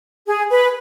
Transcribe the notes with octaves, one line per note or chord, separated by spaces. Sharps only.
G#4
B4